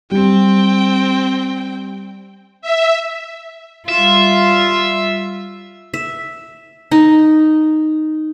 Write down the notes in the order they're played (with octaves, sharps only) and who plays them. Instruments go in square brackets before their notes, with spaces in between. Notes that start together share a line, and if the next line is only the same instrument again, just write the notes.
[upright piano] G3 [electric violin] C4 G5
[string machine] E5
[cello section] G3 F4 [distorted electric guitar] E5
[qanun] E5
D#4